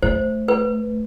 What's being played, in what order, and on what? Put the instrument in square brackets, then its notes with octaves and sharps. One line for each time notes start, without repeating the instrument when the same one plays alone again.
[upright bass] A3 [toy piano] C5
[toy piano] B4